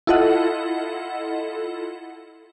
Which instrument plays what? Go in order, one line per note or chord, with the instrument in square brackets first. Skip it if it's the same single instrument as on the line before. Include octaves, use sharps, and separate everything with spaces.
[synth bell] E4 F4 A4 D#5 F#5